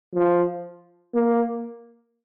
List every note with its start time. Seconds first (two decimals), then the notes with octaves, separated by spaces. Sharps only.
0.14 F3
1.14 A#3